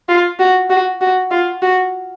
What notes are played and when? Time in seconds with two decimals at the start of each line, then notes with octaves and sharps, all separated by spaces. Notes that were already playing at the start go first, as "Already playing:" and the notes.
0.09 F4
0.39 F#4
0.70 F#4
1.01 F#4
1.31 F4
1.62 F#4